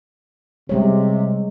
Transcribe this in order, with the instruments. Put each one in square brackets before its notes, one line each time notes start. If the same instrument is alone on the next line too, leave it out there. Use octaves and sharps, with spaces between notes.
[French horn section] C3 [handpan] G3 G#3 C#5